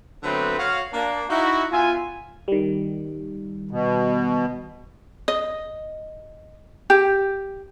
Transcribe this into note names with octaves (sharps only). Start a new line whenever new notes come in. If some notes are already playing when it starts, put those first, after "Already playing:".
D3 F#3 A3 B3 C4 B4
F#4 C#5 F5
A#3 D4
D#4 E4 F#4
B3 F4 E5 G#5
D#3 G3
B2
D#5
G4